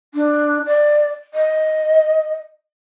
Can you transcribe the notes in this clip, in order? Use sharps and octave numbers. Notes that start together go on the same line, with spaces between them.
D4
D5
D#5